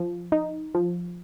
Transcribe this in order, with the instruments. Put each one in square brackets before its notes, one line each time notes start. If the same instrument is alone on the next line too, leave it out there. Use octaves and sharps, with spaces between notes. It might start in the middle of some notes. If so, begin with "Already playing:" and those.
Already playing: [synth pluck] F3
D#4
F3